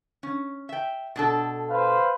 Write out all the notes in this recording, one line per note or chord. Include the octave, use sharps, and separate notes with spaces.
C#4
E5 G5
B2 D4 A4
B4 C5 F5